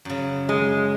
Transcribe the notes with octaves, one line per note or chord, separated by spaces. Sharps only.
F#2 C#3
G#3